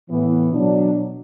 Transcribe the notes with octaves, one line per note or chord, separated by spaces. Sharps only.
A2 E3 B3
B2 F#3 D4